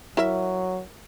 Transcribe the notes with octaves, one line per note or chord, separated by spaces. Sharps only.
F#3 E4 A#4 E5